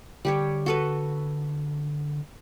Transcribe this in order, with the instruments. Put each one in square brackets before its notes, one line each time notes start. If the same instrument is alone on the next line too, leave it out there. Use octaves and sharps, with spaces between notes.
[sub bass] D3 [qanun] G3 G4 C#5
[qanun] F#4 A4 B4